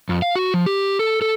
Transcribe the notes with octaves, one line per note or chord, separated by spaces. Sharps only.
F2
F5
F#4
F3
G4
A4
A4